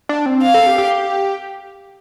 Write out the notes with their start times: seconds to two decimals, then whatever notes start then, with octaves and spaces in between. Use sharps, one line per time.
0.09 D4
0.26 C4
0.42 F5
0.54 A4
0.66 G4
0.78 G4